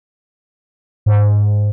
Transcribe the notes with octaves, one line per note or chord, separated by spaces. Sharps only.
G#2